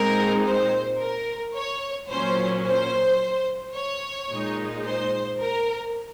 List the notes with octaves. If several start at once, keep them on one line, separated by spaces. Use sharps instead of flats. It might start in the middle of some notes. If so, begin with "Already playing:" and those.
Already playing: A#2 G#3 C4 D#4 A#4
C5
A#4
C#5
A#2 F#3 C#4 C5
C5
C#5
A#2 G#3 D#4
C5
A#4